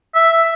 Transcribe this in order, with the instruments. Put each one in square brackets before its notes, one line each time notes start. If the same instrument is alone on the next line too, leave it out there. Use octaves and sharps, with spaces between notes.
[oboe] E5